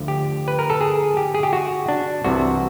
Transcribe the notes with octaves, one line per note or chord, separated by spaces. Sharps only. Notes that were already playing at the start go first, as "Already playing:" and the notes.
Already playing: D2 D3 F3
G4
B4
A#4
A4
G#4
G4
G#4
G4
F#4
D4
C2 C3 E3 F#4